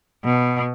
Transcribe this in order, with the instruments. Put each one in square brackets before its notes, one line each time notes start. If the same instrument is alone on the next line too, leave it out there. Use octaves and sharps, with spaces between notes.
[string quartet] B2